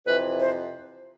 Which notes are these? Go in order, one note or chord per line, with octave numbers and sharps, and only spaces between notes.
F2 C3 E3 B4
C5